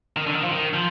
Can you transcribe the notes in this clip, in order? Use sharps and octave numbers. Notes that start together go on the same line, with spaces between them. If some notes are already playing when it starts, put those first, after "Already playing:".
D#3
D3
D#3
F3
D#3
F3